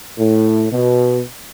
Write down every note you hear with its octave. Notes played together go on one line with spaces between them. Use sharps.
A2
B2